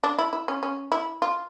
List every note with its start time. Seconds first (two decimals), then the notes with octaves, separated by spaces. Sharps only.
0.04 D4
0.19 E4
0.33 E4
0.48 C#4
0.63 C#4
0.92 E4
1.22 F4